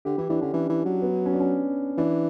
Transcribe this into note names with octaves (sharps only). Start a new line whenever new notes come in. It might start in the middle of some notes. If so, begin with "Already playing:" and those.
D3 G4
E3 E4
E3 D4
D3 C#4
E3 C#4
E3
F#3
B3
C#4
D4
C#4
E3 D4